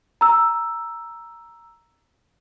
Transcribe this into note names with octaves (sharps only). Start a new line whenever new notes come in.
A#5 E6